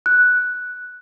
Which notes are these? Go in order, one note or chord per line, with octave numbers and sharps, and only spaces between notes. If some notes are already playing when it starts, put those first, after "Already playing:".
F#6